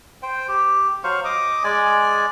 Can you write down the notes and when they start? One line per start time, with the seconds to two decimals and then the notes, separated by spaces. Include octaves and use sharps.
0.23 C5 G5
0.48 G4
1.04 F#3 C5 F5 C#6
1.24 D#5 D6 D#6
1.64 G#3 D5 G#5